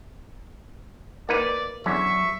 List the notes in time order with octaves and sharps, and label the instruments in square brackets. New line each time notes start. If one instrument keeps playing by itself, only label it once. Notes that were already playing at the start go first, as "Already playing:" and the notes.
[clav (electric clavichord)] A#3 D#4 B4 [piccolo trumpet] D5
[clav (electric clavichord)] E2 D3 C#4 [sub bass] F#3 [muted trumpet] E5 [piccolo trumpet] C#6